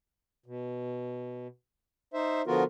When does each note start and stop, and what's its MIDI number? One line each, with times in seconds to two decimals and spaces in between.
0.46 1.47 47
2.14 2.42 63
2.14 2.42 72
2.14 2.42 76
2.47 2.64 50
2.47 2.64 53
2.47 2.64 59
2.47 2.64 65
2.47 2.64 66
2.47 2.64 70